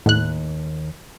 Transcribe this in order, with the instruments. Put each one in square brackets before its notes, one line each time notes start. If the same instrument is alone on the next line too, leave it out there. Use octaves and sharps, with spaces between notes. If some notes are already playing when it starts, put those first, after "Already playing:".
[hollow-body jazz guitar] D#2 [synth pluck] A2 F#6